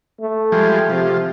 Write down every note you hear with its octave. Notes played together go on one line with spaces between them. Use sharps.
A3
F3 G3 G#3
C3 F3